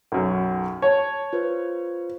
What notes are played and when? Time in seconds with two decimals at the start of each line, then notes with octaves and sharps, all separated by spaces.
0.12 B1 F#2
0.82 C#5 A5
1.33 F4 B4 C5